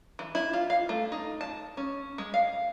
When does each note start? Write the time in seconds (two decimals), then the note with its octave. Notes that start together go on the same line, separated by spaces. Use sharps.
0.19 E3
0.35 E4
0.53 F4
0.70 F5
0.89 A3
1.12 D#4
1.41 A5
1.77 C#4
2.18 G#3
2.34 F5